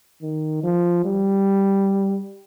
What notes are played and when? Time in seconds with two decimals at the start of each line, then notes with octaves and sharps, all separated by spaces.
0.22 D#3
0.63 F3
1.05 G3